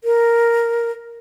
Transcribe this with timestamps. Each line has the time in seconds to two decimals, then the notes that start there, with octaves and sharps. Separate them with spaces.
0.04 A#4